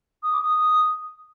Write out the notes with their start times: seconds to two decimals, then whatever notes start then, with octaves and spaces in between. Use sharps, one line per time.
0.23 D#6
0.32 D6
0.41 D#6